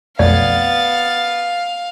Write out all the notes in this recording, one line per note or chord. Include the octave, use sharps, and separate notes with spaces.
B1 F2 A3 B3 D5 F5 A6